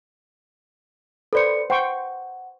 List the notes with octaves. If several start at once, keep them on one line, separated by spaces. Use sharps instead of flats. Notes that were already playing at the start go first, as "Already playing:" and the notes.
A4 B4 C5 D5 C#7
C5 F#5 G5 C#6